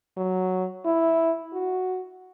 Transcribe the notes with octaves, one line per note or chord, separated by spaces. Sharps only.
F#3
E4
F#4